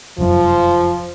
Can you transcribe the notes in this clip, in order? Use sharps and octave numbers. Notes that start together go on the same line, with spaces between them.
F1 F#2 F3